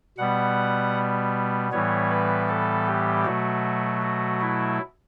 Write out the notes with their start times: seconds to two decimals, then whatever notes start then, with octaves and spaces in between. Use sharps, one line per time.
0.18 B2 G3 B3 F#5
1.71 A2 E3 G3 B3 C#5
2.10 B4
2.49 A4
2.86 G4
3.25 B2 F#3 A3 F#4
4.02 F#4
4.41 E4